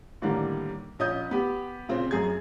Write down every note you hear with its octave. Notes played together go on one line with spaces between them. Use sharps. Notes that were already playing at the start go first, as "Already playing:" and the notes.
A2 D3 D#3 G3 A#3
A#1 C#4 D#5 D#6 G6
B3 G4
A#2 C#3 C4
F#2 G#4 G#6